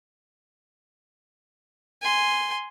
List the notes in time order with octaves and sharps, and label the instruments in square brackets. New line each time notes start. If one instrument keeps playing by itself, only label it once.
[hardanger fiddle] G#5 C6